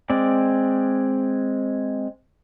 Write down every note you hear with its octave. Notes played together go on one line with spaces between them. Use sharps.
G#3 C4 D5